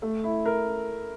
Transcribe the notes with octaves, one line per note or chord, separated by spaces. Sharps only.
A3
E4
A#4